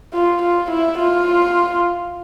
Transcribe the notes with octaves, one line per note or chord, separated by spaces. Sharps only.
F4
F4
E4
F4